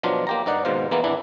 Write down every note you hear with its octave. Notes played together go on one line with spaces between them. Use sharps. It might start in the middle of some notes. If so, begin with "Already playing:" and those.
B2 F3 F#3 D4 F4
A#3 G4 A#5
G2 D#4 D5 F#5
D#2 G#2 B2 C5 F5
E2 E3 A#3 B3
G#1 E3 D4 E4